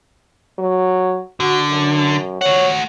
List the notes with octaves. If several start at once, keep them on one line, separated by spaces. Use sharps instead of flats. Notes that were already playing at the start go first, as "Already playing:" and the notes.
F#3
D3 F#4
F#2
A3 C#5 F#5